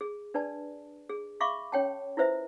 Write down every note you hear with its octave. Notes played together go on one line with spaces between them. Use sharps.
G#4
D4 B4 D5 A5
G#4
E5 F5 B5 C#6 D6
C#4 C#5 G5 A5
E4 F4 B4 C5 E5